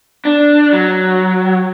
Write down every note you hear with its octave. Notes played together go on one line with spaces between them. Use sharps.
D4
F#3